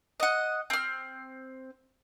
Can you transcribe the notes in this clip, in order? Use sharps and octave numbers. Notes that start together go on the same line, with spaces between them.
D#5 F#5
C4 F6